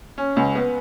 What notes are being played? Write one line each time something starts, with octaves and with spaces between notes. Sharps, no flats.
C#4
C#2
B3